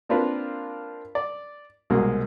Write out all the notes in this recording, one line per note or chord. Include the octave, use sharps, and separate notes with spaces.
A#3 C4 D4 F4 A#4 B4
D5
C2 B2 G#3 A#3